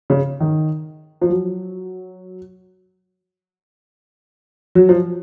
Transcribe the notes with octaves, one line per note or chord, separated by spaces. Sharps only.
C#3
D#3
F3
F#3
F#3
F3